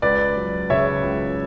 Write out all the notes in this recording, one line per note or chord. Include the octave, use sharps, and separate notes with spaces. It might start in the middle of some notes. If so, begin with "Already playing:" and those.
C#2 B4 D5
F#3
C#3 C#5 E5
C#2